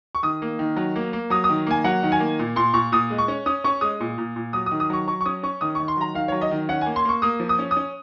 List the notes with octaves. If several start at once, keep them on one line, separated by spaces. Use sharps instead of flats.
C#6
D#3 D#6
A#3
D#3
F#3
A#3
A#3
F#3 D#6
D#6
D#3
A#3 G#5
F#3 F#5
D#3
G#5
A#3
A#2
A#2 C6
A#2 C#6
A#2 D#6
G#3
C#6
C#4
C#4 D#6
C#4 C#6
G#3 D#6
A#2
A#2
A#2
F#3 D#6
D#6
D#3
D#6
F#3 C#6
F#3 C#6
C#6
C#4 D#6
C#4 C#6
D#3 D#6
D#3 C#6
C6
F#3 A#5
D#3 F5
F#3 C#5
D#5
D#3
C#4 F#5
A#3 G#5
C6
A#3 C#6
A#3 D#6
F3
D#6
C#4
D#6
C#4